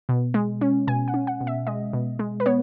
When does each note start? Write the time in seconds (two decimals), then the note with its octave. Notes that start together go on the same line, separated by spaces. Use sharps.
0.09 B2
0.34 G#3
0.61 C#4
0.88 B2 G#5
1.08 F#5
1.14 C#4
1.27 F#5
1.41 B2
1.47 E5
1.67 G#3 D#5
1.93 B2
2.19 G#3
2.40 B4
2.46 B3 C#5